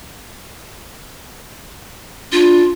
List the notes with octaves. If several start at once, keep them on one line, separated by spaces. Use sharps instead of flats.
D4 F4